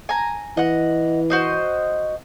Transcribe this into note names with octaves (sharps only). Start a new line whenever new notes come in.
G#5 A#5
E3 D#5 F#5
F#4 C5 D#5